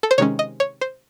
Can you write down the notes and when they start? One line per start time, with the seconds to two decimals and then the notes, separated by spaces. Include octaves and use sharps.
0.03 A4
0.11 C5
0.18 C3 D#3 G#3 C#4 C#5
0.39 D#5
0.60 C#5
0.81 C5